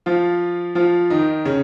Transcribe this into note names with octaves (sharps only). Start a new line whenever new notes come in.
F3 F4
F3 F4
D#3 D#4
C#3 C#4